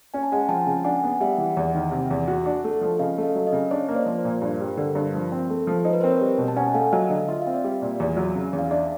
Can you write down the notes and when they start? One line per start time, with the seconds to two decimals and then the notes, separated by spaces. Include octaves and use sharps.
0.14 C#4 G#5
0.23 A5
0.32 G#3 F#5 G#5
0.49 F3 G5 A5
0.67 C#3
0.84 D4 F#5 G#5
1.03 B3
1.21 G3 E5 F#5
1.38 E3
1.57 E2
1.75 D#3
1.92 C3
2.11 E2
2.28 F#4
2.46 D4
2.64 A3
2.81 F3
2.99 C#3 D#5 F5
3.18 A3
3.23 D#5 F5
3.35 F#3
3.47 D#5 F5
3.52 C#3
3.71 D4 C#5 D#5
3.89 A#3
3.95 C5 D5
4.06 F3
4.18 A#4 C5
4.25 A#2
4.42 G2
4.61 G3
4.77 D3
4.95 G2
5.14 F3
5.32 C4
5.50 A3
5.67 F3
5.84 D#4 C5
5.93 B4
6.01 C4 A#4 C5
6.09 B4 C#5
6.21 G3
6.38 B2
6.48 A5
6.56 C#4 F#5 G#5
6.74 A3 F5 G5
6.92 F#3 D#5 F5
7.10 D3 D#5 F5
7.28 F4 E5
7.41 F5
7.46 C4
7.54 D5 E5
7.64 G3
7.82 A#2
8.00 E2
8.17 F#3
8.35 C#3
8.53 E2
8.59 F5
8.71 D4 D5 E5